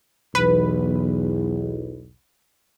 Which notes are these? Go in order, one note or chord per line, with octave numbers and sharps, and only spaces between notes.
B1 E2 B4